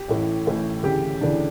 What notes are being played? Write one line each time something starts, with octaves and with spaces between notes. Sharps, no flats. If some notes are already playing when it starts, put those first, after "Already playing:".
Already playing: G4
A1 A2 E3
A1 A2 E3
D2 C#3 E3 G4
D2 C#3 E3 D4